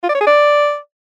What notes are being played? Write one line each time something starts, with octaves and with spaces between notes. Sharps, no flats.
F4
D5
C#5
G#4
D5